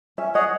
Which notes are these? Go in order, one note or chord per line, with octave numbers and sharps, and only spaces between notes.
C#4 E5
G#4 C#5 D#5 F#5